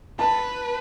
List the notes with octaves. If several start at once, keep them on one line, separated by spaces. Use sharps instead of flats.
B4 A5